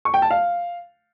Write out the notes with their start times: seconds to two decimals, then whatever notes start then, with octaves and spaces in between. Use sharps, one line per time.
0.05 C#6
0.14 G5
0.22 A5
0.31 F5